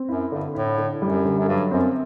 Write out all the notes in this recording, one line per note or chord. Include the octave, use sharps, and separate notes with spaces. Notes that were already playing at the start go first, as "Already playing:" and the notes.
Already playing: C4
F#2 E4
G2 D3
A2 E4
D3
F#2 G3
D3
F#2
G2 F#3
F#2 C4